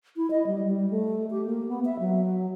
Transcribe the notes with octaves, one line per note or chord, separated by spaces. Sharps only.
E4
D#5
G3
G3
A3
G4
A#3
B3
E5
F#3